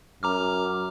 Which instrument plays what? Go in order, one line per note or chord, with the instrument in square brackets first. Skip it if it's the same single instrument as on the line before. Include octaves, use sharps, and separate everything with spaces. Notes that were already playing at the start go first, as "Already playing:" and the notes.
[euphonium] F#2 [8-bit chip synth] A#5 D6 F6